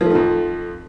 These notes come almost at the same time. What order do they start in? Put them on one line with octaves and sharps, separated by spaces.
F3 A3 D#3 F2